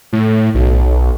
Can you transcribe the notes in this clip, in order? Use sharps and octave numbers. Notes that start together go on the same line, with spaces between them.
A2
B1